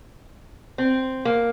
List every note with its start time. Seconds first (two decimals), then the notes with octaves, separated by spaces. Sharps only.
0.78 C4
1.25 A#3